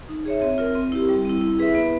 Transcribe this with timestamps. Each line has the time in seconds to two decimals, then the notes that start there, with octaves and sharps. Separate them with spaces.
0.08 D#4
0.25 G#4 C#5 E5
0.42 C4
0.58 F4 A#4
0.75 C4
0.92 E4 G4
1.09 G3
1.25 C4 E4
1.41 E4
1.59 G#4 B4 E5
1.75 B3